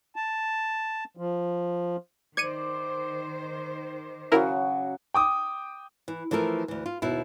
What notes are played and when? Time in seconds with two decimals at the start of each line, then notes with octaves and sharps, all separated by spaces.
0.16 A5
1.17 F3
2.37 D#3 C5 D5 G#6 C#7 D#7
4.32 C#3 F#3 E4 F#4 A#4
5.14 G5 D6 D#6
6.08 E3
6.31 E3 F3 A3 A4 A#4
6.68 D2 E3
6.86 F4
7.02 D#2 B2 E4